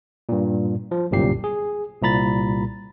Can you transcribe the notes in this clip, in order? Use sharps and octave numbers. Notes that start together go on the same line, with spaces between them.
G2 A#2
F3
G1 C2 F#2 A#2 G4 C7
G#4
C2 A#2 A#5 B5 A6